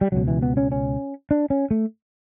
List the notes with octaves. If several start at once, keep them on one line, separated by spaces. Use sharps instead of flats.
G3
C#2 B2 F#3
E3
B3
C#4
C#4
D4
C#4
A3